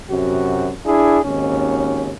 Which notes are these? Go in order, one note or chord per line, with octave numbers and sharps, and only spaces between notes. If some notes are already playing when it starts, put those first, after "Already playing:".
F#2 C3 F#4
D4 E4 G#4
G#1 D#2 C#4